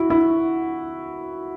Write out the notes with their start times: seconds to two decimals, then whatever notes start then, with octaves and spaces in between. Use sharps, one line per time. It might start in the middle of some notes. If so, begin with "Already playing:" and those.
Already playing: E4 F#4
0.10 E4